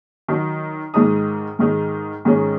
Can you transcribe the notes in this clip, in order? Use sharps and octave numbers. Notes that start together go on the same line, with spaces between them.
D#3 F#3 D#4
G#2 D#3 G#3 D#4 D#6
G#2 D#3 G#3 D#4
G#2 D#3 G#3 C#4